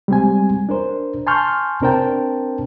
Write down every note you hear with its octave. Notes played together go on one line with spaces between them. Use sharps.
G3 G#3 C4 G#5
D4 A#4 C5
G#5 A5 C6 C#6 F6 G6
C4 D4 A#4 C5 G5 A5